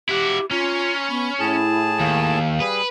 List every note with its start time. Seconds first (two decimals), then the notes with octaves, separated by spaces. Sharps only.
0.09 E4 F#4 G4
0.51 C#4 F4 G#5 A#5 C6
1.09 B3 B5 C#6
1.40 A2 E4 G#4 A5
2.00 D#2 F5
2.60 G3 G#4 B4